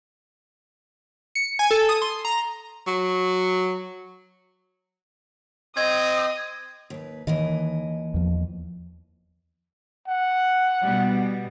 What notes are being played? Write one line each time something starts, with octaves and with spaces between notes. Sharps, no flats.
C#7
G#5
A4
D#6
C6
A#5
F#3
C4 D#5 D#6 G#6
D#2 B4
D#2 D#3 E3 D#5
E2 F3
F#5
B2 G3